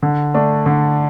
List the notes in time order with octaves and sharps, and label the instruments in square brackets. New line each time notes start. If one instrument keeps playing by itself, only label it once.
[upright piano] D3
A3 D4
D3